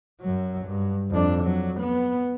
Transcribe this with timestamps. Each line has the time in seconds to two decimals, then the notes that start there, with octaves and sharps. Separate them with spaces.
0.21 F#2 F#3
0.65 G2
1.10 F2 D4
1.43 F#3
1.80 B3